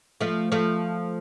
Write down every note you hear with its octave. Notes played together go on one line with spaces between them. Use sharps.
F3 A3
F3 A3